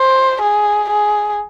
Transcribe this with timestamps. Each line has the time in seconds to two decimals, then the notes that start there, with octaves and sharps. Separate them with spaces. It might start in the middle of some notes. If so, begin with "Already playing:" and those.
Already playing: C5
0.41 G#4
0.90 G#4